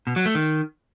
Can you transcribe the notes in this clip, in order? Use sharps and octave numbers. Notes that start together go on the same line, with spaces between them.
B2
F#3
A3
D#3